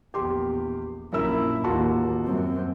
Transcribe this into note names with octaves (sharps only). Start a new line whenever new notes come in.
A#1 E2 G4 C6
A#1 F#2 E4 A#4 E6
A1 D#2 F4 F#4 A5
F#2 C4